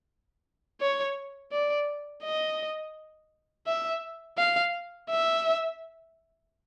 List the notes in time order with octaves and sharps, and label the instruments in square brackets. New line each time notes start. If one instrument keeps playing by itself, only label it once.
[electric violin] C#5
D5
D#5
E5
F5
E5